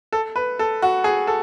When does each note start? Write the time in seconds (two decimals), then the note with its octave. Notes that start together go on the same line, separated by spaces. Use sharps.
0.13 A4
0.36 B4
0.59 A4
0.82 F#4
1.04 G#4
1.27 A4